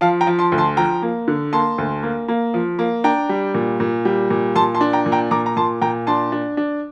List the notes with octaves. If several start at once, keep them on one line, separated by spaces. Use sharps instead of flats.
F3 F5 A5
G5 A#5
F3
A5 C6
D2
A5 C6
F3 G5 A#5
A#3
D3
A#3 A5 C6
D2
A#3
A#3
F3
A#3
D4 G5 A#5
G3
A#2
A#2
G3
A#2
A#2 A5 C6
A5 C6
D4
G5 A#5
A#2
G5 A#5
A#2 A#5 D6
A#5
A#2 A5 C6
A#2 G5 A#5
D4 A5 C6
D4
D4